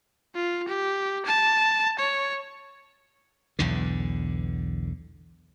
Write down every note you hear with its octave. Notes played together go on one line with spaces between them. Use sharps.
F4
G4
A5
C#5
B1 E2 D3